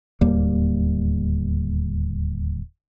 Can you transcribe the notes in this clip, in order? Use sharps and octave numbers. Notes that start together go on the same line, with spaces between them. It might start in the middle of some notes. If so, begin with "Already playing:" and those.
D1 D#2 G3 A#3